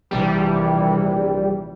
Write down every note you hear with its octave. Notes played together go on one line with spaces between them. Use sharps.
A#1 C3 E3 G3